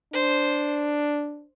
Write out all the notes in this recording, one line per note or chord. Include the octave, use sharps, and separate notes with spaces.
D4 C5